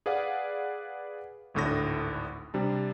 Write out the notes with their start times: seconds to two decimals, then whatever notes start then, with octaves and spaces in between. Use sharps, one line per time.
0.06 G#4 B4 D5 F5 F#5
1.54 G#1 D2 A2 D3 D#6 A#6
2.54 C3 G3 D4